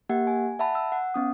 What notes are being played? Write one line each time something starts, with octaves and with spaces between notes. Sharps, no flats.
A#3 G4 F#5
G#5
E5 F#5 A5 B5
E6
F#5
B3 C#4 D#6